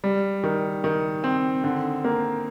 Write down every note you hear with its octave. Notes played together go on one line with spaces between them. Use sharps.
G3
D#3
D#3
C4
D3
A#3